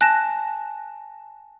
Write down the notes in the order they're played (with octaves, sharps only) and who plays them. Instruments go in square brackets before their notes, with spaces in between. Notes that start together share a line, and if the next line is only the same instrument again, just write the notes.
[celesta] G#5 A5 [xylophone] F#6 A#6 E7